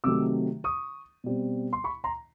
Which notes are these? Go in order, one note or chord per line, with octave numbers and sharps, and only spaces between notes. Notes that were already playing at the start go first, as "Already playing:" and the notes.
C3 D#3 F#3 A3 D6 E6
C#6 D#6
B2 G3 C4
C6
B5 C#6
A#5 C6